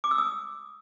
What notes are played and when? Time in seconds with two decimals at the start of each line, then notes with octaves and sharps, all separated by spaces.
0.04 D6
0.11 E6
0.18 D#6